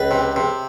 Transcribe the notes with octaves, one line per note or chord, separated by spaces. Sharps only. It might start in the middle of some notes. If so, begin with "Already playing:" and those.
Already playing: C#2 B4
C3
C3